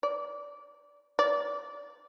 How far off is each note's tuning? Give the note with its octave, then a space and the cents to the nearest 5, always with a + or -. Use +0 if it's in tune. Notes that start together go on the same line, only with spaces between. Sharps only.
D5 -15
D5 -30